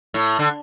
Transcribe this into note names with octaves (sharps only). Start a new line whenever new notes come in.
A2
D3